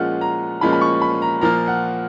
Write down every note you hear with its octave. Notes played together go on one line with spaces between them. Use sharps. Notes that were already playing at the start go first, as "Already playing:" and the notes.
Already playing: A#2 F3 G#3 C#4 F4 F#5
A#5
A#2 F3 G#3 C#4 F4 B5
B5
C#6
B5
A#5
A#2 F3 A#3 F4 A#5
F#5